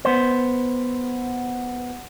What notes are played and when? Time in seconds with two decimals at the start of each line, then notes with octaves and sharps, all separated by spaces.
0.05 B3 C5